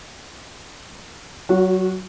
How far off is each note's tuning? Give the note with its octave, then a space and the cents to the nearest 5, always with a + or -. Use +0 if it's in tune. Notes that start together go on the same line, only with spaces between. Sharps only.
F#3 +20 F#4 -20